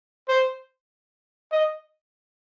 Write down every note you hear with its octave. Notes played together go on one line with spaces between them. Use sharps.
C5
D#5